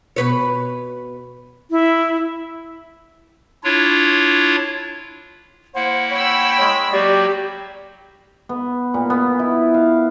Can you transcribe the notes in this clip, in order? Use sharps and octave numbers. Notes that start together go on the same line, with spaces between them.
B2 B4 C#5
E4
D4 E4 F4 C#5
A#3 E4 C5 F#5
C#5 G5 B5 E6
G#3 C#6
F#3 A#3 F#4 G4 D5
B3
A#2
B3
E4
F5